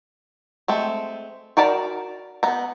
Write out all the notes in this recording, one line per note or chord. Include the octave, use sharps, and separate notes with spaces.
G#3 A3 C4
F#4 A#4 D5 A5 B5
B3 A#5